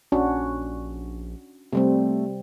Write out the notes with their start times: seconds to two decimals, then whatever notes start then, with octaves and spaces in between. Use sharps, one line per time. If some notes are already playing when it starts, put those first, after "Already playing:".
0.12 A#1 C#4 D4 F#4
1.73 C3 G3 A3 C4